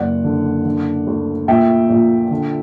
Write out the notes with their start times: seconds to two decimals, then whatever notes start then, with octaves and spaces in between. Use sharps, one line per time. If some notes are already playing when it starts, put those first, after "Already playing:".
Already playing: F#1 D5 F#5
0.24 D3
0.65 D3
1.07 D2
1.48 A#2 E5 G5
1.89 A#1
2.30 D3